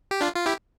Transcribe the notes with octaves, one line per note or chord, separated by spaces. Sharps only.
G4
D4 F4
F4
E4 G4